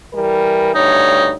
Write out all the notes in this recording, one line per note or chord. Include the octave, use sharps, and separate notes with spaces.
E3 G3 A#4
D2 G2 D#4 C#5